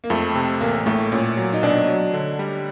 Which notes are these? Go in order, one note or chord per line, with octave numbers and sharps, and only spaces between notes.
A#3
F2 A3
C3
A1 A#3
A2 A3
A#2 C#4
F#3
D#4
B2 D4
F#3
D3
G3